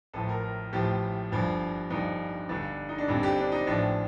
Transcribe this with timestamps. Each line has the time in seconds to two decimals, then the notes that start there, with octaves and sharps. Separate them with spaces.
0.14 A1 A2 F3 A4
0.29 A#4
0.43 A#4
0.73 A1 A2 F3 G4
1.32 G1 G2 F3
1.90 G1 G2 F3 D#4
2.49 G1 G2 D3
2.89 D#4
2.98 D4
3.08 G1 G2 D3 C4
3.23 G4
3.38 D4
3.52 D#4
3.67 A1 A2 F3 D4